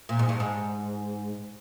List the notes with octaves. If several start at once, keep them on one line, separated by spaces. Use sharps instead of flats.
A#2
G#2
G2
G#2